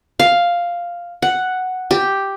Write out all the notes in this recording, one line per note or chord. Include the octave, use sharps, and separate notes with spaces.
F5
F#5
G4